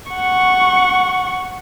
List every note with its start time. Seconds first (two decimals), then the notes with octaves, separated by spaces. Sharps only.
0.11 F#5 C#6